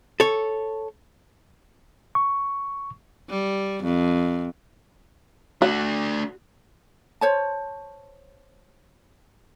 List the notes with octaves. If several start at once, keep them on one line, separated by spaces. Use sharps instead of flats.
A4 C#5
C#6
G3
F2
A3 D4 F#4
C5 C#5 A5